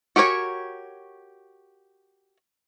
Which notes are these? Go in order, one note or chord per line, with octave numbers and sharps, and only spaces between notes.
F#4 G4 A#4 C#5 G#5